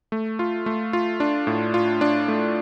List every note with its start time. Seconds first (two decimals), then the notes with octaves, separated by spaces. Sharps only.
0.12 A3
0.39 F4
0.66 A3
0.93 F4
1.20 D4
1.47 A2
1.74 F4
2.01 D4
2.28 A3